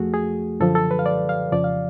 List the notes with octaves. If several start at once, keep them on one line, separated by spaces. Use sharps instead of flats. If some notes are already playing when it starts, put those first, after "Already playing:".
Already playing: F2 F3 A3 F#4 G#4
G#4
F#2 D3 F3 A4
A4
B4
F5
D5
F5
F2 C#3 F3 D5
F5